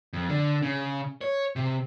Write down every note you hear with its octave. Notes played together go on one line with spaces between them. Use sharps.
F2
D3
C#3
C#5
C3